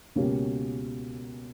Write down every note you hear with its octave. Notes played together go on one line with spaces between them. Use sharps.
C#2 B2 A#3 C#4 G4